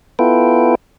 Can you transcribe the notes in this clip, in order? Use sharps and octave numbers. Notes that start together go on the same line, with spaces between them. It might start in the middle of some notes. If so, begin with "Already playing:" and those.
B3 E4 F4 A4 B4 G5